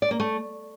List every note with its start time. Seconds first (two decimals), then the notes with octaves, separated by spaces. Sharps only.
0.02 D5
0.11 A#3
0.20 A3